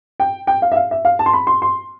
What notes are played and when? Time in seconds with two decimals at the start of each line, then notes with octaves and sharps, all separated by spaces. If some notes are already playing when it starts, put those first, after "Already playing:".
0.20 G5
0.47 G5
0.62 F5
0.72 E5
0.76 F5
0.91 E5
1.05 F5
1.19 A5
1.26 C6
1.33 B5
1.47 C6
1.62 C6